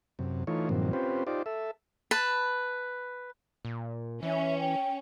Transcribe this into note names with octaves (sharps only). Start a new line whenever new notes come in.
F#2 C3
E3 A3 D#4 F4 C#5
G2 A#2 D#3 F3 F#3 C4
C4 C#4 F4 G4 B4 C5
D#4 F4 G4 C5 D5
A4 E5
B4 A5
A#2
E3 C#4 E5
G5